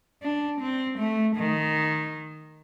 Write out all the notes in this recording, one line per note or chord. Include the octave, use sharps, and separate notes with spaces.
D4
C4
A3
D#3